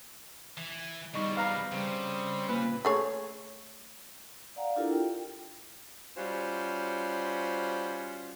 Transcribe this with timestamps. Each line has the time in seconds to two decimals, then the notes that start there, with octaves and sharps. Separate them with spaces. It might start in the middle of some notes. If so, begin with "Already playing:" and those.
0.57 E3
1.14 E2 F3 G3 D#4 C#6
1.37 B4 F5 A#5
1.72 C#3 G3 C4
2.49 A#2 B4
2.85 A3 G#4 C#5
4.56 D5 F5 F#5 A#5
4.76 D4 E4 F4 G4 A4 A#4
4.91 F4 G5
6.16 G3 C#4 F4 F#4 C5